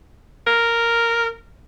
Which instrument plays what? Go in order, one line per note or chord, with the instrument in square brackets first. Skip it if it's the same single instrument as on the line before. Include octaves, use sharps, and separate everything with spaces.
[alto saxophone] A#4